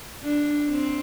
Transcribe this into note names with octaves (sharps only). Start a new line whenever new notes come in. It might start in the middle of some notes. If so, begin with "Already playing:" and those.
D4
C4